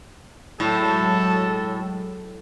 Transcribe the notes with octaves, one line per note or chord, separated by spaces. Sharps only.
A2 F#3 G#3 A4